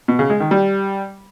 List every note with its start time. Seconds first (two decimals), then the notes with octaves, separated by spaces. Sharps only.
0.08 B2
0.19 C#3
0.30 G#3
0.40 D#3
0.51 G3